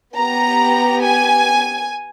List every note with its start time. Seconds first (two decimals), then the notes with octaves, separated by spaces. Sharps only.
0.15 B3 G4 A#5
1.04 G#5